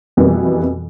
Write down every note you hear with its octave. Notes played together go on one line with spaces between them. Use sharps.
F2 B2 E3 G3 A#3 B3